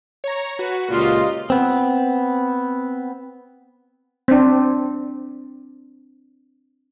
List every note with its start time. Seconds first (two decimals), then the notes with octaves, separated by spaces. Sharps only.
0.24 C#5 A#5
0.59 F#4 B4
0.90 C#2 A#2 F4 G4 D#5
1.50 B3 C4
4.28 C4 D4